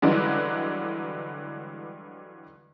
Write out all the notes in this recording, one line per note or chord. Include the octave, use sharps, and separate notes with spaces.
G2 D3 E3 F#3 G#3